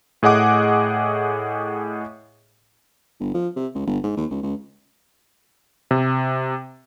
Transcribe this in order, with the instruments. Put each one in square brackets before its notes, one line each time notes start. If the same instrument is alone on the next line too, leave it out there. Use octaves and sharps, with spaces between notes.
[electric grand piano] A2 G#4 D#5 F#5 D6
[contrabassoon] G1
F3
C3
C#2
G1
G#2
D#2
C#2
C#2
[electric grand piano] C3